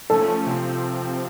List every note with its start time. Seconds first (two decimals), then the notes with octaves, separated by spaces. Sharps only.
0.10 F3 A3 C#4 A4
0.46 C3 F3 C4